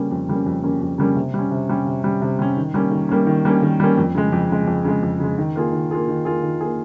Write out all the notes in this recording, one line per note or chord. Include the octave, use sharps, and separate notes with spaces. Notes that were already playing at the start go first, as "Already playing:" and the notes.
Already playing: C#3 G3 A#3 C#4
F2
C#3 G3 A#3 C#4
F2
C#3 G3 A#3 C#4
F2
C#3 G3 A#3 C#4
C3
G3 C#4
C3
G3 C#4
C3
G3 C#4
C3
G3 C#4
D#3
G3 A#3 C#4
D#3
G3 A#3 C#4
D#3
G3 A#3 C#4
D#3
G3 A#3 C#4
F2
C#3 G#3
F2
C#3 G#3
F2
C#3 G#3
F2
C#3 G#3
D#3
A#3 F4 G#4
D#3
A#3 F4 G#4
D#3
A#3 F4 G#4
D#3
A#3 F4 G#4